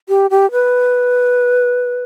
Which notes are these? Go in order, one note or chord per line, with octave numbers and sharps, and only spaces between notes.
G4
G4
B4